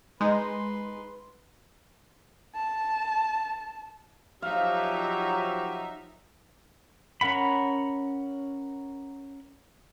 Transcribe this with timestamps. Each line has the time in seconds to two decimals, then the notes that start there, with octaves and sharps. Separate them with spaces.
0.21 G#3 D#4 B4 C6
2.55 A5
4.42 F3 F#3 D#4 G4 E5 F5
7.21 C#4 A#4 F#5 B5